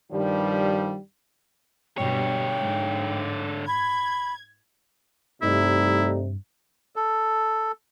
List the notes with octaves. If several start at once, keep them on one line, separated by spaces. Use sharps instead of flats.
G2 D#3 F3 G3
G2 B2 D3 G3 C#5 G5
G#2
B5 G#6
G2 C3 G3 A3 D#4 E4
A4